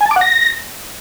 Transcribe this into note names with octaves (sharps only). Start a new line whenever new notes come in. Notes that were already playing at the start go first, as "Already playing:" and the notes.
G#5
A5
D6
F#5
A#6